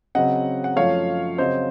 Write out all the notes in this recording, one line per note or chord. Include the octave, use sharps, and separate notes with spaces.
C#3 F#3 C4 D#5 F#5
F#5
F#2 F3 A3 C#5 F5
C#3 F#3 C4 C5 D#5